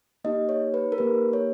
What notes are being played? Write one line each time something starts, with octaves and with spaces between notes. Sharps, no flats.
A#3 D#4 G4 D#5
C#5
B4
A#4
A#3 D#4 G4 B4
C#5